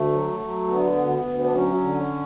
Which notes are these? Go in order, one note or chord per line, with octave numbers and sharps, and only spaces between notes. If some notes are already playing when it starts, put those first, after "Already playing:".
Already playing: D2 A3
F#3
F#3
D3 B3
D2
D2
D4
F#3 C#4
D3